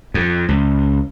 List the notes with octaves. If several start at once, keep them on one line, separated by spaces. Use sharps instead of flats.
F2
C#2